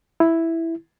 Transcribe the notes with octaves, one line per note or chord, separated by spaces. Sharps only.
E4